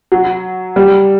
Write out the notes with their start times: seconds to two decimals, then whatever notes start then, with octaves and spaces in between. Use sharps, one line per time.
0.12 F#3
0.76 G3